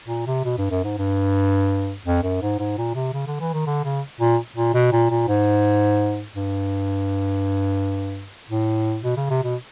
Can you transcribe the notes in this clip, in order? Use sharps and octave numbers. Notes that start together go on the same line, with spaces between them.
A#2
C3
B2
G2
F#2
G#2
G2
F2
F#2
G#2
G#2
A#2
C3
C#3
D3
E3
D#3
D3
C#3
A#2
A#2
B2
A#2
A#2
G#2
G2
A2
B2
C#3
C3
B2